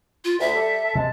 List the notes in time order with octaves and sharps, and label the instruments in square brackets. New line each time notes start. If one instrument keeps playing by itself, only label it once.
[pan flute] F4
[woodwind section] D2 [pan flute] E5
[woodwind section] G3 A4
A4
[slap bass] C3 [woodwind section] G#3 A5